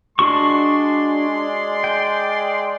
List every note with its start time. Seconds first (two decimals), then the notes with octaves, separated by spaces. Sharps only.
0.19 G#3 D4 F#4 D5 C6 C#6
1.84 G5